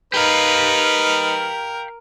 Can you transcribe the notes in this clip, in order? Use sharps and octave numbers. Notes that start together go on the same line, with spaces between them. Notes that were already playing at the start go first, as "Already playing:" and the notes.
D#4 G4 A#4 B4 F5